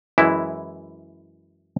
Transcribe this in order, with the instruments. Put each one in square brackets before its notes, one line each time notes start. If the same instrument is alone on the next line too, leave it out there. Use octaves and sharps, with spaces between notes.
[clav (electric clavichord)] F#2 E3 G#3 E4